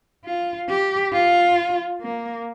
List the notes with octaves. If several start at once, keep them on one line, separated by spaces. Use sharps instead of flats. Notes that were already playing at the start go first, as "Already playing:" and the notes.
F4
G4
F4
A#3